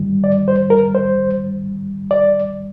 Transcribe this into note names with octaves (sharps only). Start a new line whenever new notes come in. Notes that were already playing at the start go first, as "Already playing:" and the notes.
Already playing: G#2 D#3 G3
D5
C5
A#4
C5
D5